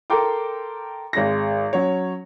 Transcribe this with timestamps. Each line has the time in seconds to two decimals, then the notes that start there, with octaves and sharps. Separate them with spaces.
0.10 A4 A#4 G5 C6 D6
1.13 G#1 G#3 A#6
1.73 F#3 C#4 C#5